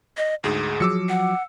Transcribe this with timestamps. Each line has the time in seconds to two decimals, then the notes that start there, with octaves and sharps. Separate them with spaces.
0.17 D#5
0.44 D2 G#2 G#4
0.80 F3 F#3 D6 E6 C#7
1.09 F#5